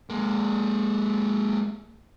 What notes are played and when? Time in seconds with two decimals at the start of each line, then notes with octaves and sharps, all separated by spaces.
0.10 G#3 A#3